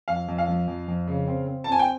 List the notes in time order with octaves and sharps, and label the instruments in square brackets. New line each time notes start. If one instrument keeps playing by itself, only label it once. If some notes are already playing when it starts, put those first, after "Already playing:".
[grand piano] F2 [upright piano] F5
[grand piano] F2
[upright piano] F5
[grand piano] F3
F2
F2
C#3
C4
C4
[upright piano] A5
[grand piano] C4 [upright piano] G#5
[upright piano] G5